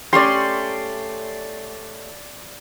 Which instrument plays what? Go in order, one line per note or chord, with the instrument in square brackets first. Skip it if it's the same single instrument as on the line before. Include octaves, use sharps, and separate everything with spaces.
[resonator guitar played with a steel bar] A3 C#4 G4 [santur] D5 C6